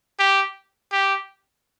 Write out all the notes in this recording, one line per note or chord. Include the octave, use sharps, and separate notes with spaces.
G4
G4